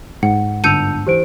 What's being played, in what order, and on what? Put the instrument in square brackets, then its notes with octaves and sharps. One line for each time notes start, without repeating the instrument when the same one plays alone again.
[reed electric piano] G#2 [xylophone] F#5
[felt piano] G1 [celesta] A5 E6 F7 [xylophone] G6 C#7 D#7
[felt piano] E3 [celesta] G4 C5 D7